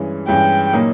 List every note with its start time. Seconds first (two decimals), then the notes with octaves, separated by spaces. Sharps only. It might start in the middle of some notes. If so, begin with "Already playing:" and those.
Already playing: G2 E3 G#3 C#4
0.28 G2 E3 G#3 C#4 G5
0.73 A#2 F#3 A#3 D#4